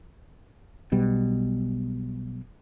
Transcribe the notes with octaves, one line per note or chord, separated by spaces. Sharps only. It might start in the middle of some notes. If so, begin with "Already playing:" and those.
B1 B2 G3